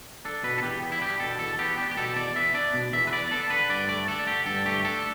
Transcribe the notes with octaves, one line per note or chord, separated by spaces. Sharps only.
D4 A4
B2 B4
A4
E2 G4
B3
E4
D4 G4
B2 A4
E2 A4
B3 G4
D4 G4
G4
B2 A4
E2 D5
B3 E5
D4 D5
B2
E2 E5
B4
B3 D5
D4 A4
D3 B4
G2 D5
A3 D5
D4 A4
D3 G4
G2 A4
A3 G4
D4 A4